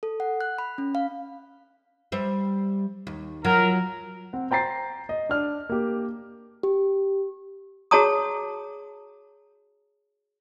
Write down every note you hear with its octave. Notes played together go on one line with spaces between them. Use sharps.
A4
F#5
F#6
B5
C#4
F5
G3 C5 E5
D#2
F#3 F4 A#4
C4 F#5
C5 G5 A#5 A6 C7
D#5
D4 F6
A#3 G4
G4
F#4 G#4 C#5 A5 A#5 D#6